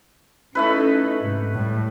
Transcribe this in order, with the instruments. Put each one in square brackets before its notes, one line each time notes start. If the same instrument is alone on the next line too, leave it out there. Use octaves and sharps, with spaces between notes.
[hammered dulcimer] A3 E4 B4 [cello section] C#4 D#4 A4
[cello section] G#2 C3
[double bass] A2 [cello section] G3